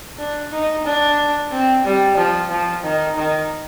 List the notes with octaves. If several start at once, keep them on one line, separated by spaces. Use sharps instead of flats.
D4
D#4
D4
C4
G3
F3
F3
D#3
D#3